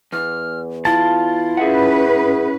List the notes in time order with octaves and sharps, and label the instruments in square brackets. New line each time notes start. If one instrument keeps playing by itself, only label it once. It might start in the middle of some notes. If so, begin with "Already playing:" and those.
[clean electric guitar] E2 [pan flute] F6
[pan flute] E4 [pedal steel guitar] F4 A5
[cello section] C#4 B4 [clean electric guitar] G#4 E5 F#5